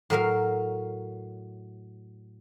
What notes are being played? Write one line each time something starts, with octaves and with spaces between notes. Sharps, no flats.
A2 F#3 A#4 F5